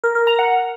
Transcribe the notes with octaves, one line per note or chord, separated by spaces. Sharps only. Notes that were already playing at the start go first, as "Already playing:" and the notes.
A#4
A#4
A#5
F#5